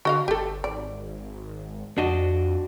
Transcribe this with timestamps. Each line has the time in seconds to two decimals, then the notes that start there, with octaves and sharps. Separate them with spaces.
0.05 D3 F#4 D#5 F5
0.28 G1 G4 A4
0.64 G#1 D5
1.98 F2 D4 F#4 D#5